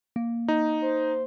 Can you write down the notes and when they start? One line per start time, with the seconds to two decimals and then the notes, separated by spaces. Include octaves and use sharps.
0.16 A#3
0.48 D#4
0.83 C5